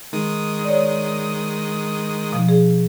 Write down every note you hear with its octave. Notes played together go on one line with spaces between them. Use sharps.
D#3 G#3 D#6
C#5 D5
B2 F3
G#4